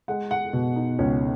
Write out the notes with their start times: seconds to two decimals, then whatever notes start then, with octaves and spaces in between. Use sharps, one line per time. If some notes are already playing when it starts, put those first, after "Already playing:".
0.08 G#3 F#5
0.31 F#5
0.53 B2
0.76 D#4
0.99 C#2 C#4